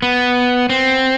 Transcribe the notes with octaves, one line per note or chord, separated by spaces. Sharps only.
B3
C4